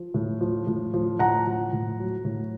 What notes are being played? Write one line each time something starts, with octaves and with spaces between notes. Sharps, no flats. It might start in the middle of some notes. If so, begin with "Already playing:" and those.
Already playing: F3
A2
F3
A2
F3
A2 F#5 A#5
F3
A2
F#3
A2